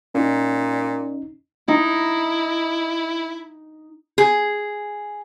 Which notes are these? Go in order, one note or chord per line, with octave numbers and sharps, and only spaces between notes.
A#2 C#4 D#4
D#4 E4
G#4